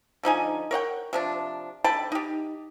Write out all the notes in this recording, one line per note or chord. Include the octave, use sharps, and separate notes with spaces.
D3 F3 D#4 G#5
A#4 C#5 F#5 G5
C3 F3 D4
D3 G5 A5 B5
D#4 G4